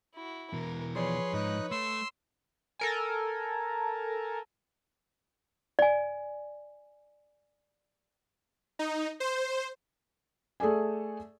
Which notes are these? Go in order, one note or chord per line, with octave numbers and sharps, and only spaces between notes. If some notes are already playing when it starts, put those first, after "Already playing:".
E4 F#4
B2 E3 A#4
F3 G#4 B4 C#5 D5 C6
G#2 D#4 F#6
A3 C6 E6
A4 A#4 G#5
D5 G#5
D#4
C5
A3 G#4 A4 D5 G#5